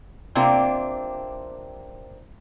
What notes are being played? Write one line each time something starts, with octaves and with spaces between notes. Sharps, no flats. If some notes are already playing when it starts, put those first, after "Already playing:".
C3 A#3 C4 D4 F4